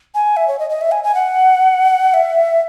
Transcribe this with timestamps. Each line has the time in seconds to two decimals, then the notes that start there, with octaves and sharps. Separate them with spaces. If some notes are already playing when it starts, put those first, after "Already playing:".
0.15 G#5
0.37 E5
0.48 C#5
0.59 D#5
0.70 D#5
0.81 E5
0.92 G#5
1.04 G#5
1.14 F#5
2.14 E5